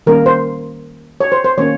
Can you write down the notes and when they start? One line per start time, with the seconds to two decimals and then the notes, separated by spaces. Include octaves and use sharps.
0.06 D#3 G3 A#3 C#4 A#4
0.26 C5
1.20 C#5
1.32 C5
1.44 C5
1.58 D#3 A#3 C#4 C#5